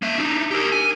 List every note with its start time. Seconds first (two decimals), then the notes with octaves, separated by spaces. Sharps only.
0.02 A#3 E5
0.18 D4 D#4
0.51 G4 A#4
0.72 G#5